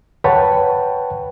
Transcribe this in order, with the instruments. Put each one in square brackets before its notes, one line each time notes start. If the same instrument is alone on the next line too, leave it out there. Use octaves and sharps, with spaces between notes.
[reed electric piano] B4 C#5 F#5 G5 A5 B5